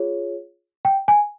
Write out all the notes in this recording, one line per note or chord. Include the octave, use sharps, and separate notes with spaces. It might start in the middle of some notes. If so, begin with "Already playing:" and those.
Already playing: F4 G#4 C#5
G5
G#5